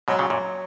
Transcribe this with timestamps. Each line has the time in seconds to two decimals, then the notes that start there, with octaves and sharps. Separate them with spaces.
0.07 G#2 B2 F#3
0.19 A#2 C#3
0.30 F#2 A#2 F#3